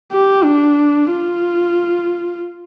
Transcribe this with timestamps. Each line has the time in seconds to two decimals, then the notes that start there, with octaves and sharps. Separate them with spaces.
0.12 G4
0.44 D4
1.11 F4